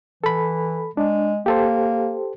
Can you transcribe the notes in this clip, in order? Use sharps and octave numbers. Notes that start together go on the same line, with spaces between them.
E3 A4 B5
G#3 D4
A#3 G4 A4 C5